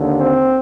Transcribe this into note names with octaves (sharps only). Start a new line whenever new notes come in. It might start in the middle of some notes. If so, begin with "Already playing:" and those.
Already playing: D#2 D3
C4